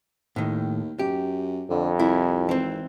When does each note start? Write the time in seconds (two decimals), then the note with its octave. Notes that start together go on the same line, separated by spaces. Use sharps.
0.36 D#2 A2 D#3
0.99 F#2 G4
1.70 F2 D3
1.99 C2 E4
2.49 G#1 E3 C4